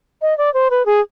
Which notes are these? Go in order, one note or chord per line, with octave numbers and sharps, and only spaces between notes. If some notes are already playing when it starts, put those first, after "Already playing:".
D#5
D5
C5
B4
G#4